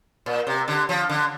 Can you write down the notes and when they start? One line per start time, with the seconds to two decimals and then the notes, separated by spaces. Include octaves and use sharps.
0.26 A#2
0.47 C3
0.68 D3
0.89 F3
1.09 D3